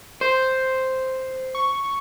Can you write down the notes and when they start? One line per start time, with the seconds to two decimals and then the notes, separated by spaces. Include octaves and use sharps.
0.21 C5
1.55 C#6